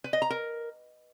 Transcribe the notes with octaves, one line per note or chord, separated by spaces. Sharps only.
B4
D#5
A#5
A#4